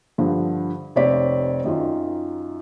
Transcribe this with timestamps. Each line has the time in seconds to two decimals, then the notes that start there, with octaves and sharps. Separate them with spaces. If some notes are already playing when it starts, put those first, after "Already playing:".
0.18 G2 D3 F3
0.96 F1 C4 C#5 D5 B6
1.64 F#2 D#3 F4